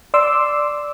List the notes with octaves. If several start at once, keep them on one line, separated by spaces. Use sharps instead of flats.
D5 C6 D6 E6